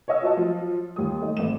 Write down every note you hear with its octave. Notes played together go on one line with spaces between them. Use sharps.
C#5 D#5 E6
F4 F#4 D#5 A5
F3 F#3 F4
D#2 G3 D#6
A3 D#4
G#1 A3 B3 E7